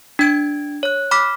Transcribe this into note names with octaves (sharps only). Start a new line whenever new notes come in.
D4 G#6 D7
C#5 F#6
B5 D6 F6 B6